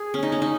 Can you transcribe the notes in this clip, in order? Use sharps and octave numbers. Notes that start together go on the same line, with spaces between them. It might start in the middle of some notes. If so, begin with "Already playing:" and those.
Already playing: G#4
C#4
D#4
C#4
D#4